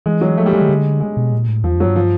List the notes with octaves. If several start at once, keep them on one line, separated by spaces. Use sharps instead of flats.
E3 G#3
F#3
F3 A3
G3
F#3 G#3
D#3
D3
G#3
B2
A#2
A2
E2 F3
F2
G2 F#3
F3